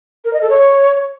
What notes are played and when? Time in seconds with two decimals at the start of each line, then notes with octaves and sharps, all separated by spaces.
0.25 A#4
0.33 D#5
0.42 A4
0.50 C#5